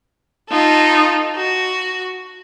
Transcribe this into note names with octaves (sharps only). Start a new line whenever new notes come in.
D#4 F4 A4
F#4